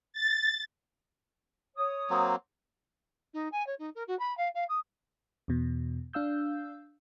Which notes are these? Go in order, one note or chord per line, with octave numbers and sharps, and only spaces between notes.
A6
C#5 D#6
F#3 A#3 C4
D#4
G#5
C#5
D#4
A#4
F#4
B5
F5
F5
D#6
E2 B2
D4 F5 E6 G6